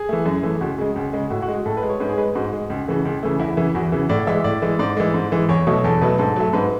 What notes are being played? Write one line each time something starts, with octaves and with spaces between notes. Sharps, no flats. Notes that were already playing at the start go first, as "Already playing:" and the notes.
Already playing: G#4
E3 A3
F#2
E3 A3
C#2 F#4
C#3 G#3
C#2
C#3 G#3
A2 F#4
F#4
G#3
F#4
A2 A4
B4
G#3
C#5
G#2 B4
G#4
G#3 B4
G#2 F#4
G#3
C#2
C#3 E3 A3
C#2
C#3 E3 A3
E2 E4
C#3 E3
E2 F#4
C#3 E3
A2 D5
E3 G#3 E5
A2 D5
E3 G#3
G#2 D5
E3 G#3
G#2
E3 G#3
E2 C#5
B2 F#3 A3
E2 A4
B2 F#3 A3 B4
G#2 A4
F#3 A3
G#2 B4